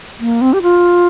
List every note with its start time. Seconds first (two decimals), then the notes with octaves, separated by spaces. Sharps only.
0.20 A#3
0.41 C4
0.53 G4
0.62 F4